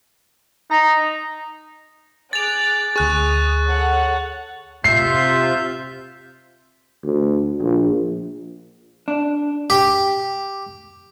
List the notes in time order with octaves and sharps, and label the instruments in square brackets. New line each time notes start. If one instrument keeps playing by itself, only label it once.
[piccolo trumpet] D#4 [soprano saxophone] A#5
[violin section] G#4 D6 F#6 [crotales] A6 F7
[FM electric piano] D2 G#4 [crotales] C#6 F#6 [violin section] D#6
[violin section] A4 C#5 F#5
[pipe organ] C3 F4 [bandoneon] E5 G6 [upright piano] C7
[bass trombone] D2
A#1
[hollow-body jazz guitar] D4
[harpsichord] G4